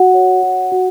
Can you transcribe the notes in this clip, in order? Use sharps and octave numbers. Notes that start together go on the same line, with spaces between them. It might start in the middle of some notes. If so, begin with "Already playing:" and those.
Already playing: F#4 F#5
C#5
F#4
F#4